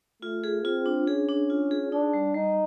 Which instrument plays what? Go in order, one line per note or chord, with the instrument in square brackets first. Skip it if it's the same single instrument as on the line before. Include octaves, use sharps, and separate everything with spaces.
[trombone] A3 [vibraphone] F4
[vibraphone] G#4
[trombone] C4 [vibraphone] F4
[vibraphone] D4
[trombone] C#4 [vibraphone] G#4
[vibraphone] D4
F4
G#4
[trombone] D4 [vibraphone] D#4
[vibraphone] G3
[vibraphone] G3 [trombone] D#4